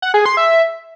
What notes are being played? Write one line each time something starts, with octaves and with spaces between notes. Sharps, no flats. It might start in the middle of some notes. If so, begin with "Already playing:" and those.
F#5
G#4
C6
E5